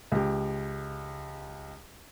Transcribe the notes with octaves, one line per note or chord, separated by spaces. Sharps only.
C#2 G4